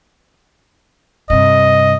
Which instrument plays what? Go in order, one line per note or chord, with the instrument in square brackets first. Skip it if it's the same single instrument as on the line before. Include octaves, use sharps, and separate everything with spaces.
[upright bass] G2 C3 [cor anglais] D#5